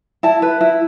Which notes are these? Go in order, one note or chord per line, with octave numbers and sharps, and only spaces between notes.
E4 A5
B4
E4